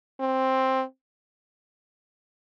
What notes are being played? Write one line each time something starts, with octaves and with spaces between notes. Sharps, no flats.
C4